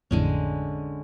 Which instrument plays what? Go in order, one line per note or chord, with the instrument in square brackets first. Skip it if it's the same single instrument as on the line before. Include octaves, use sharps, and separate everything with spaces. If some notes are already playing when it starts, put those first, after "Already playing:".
[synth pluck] A1 F2 A2 [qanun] D3 G#3 C#4